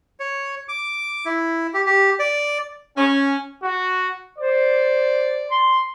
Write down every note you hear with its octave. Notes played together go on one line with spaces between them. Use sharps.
C#5
D6
E4
G4
G4
D5
C#4
F#4
C5 D5
C6